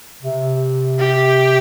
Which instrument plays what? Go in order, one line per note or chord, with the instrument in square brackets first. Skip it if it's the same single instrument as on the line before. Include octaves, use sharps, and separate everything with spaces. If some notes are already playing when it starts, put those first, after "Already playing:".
[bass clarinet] C3
[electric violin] G4